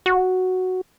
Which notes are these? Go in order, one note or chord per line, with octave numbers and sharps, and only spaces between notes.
F#4